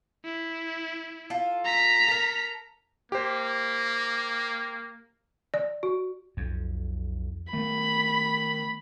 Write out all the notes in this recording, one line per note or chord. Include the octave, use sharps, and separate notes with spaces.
E4
F4 A4
A#5 B6
A4 A#4
A#3 G4 C5
D5
F#4
B1 F2
D#3 A3 B3 B5